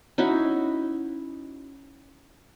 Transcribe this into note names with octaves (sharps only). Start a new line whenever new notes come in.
C#4 D#4 E4 F#4